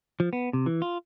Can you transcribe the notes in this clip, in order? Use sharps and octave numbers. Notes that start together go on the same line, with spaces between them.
F3
B3
C3
E3
F4